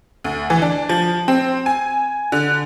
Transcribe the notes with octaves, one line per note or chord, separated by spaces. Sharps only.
D2
E3
D4
F3
C4
G#5
D3